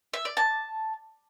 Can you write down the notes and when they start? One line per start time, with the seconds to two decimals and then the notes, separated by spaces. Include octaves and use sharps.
0.14 E5
0.25 D5
0.37 A5